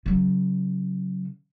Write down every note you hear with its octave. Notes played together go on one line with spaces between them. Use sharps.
C#3 F#3